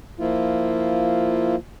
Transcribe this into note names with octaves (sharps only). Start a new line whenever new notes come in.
F3 A#3 E4 F4